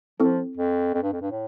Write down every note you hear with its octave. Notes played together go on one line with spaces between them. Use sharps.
F3 C4 E4 A4
F2
F2
G2
F2
G2
A2